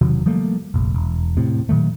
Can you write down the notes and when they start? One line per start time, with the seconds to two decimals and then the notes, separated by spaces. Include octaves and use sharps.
0.01 E1 C3 D#3 F#3
0.26 F3 G3 A3 A#3
0.74 F1 A#1
0.94 E1
1.37 A2 C3
1.69 A#2 D#3 F#3 A3